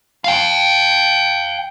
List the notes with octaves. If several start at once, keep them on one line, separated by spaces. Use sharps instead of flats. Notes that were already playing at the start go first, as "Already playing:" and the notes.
F5 G5